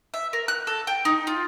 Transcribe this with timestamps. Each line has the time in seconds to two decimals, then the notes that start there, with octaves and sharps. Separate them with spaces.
0.14 E5
0.33 A#4
0.48 F#6
0.67 A4
0.87 G5
1.05 D#4
1.27 F4